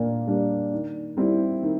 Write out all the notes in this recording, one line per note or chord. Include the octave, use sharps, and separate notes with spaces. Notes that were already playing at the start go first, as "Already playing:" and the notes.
Already playing: A#2 A#3 D4
G3 A#3 D4
D#3
G3 C4 E4
D#3